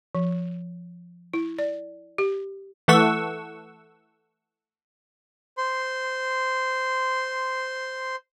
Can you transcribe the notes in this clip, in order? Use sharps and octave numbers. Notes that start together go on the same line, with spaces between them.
F3
E4
D5
G4
E3 A3 A4 F#5 C#6 E6
C5 C6